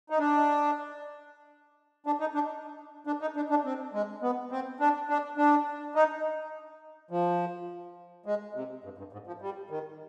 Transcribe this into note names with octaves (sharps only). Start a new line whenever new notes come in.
D#4
D4
D4
D#4
D4
D4
D#4
D4
D4
C4
G#3
B3
C4
D4
D4
D4
D#4
F3
G#3
C3
G2
G2
G#2
F3
G3
D#3